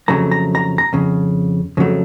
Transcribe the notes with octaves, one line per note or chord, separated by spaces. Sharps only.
F2 C#3 F#3 A3 A#5
A#5
A#5
A#5
F2 C#3
F2 C#3 F#3 A3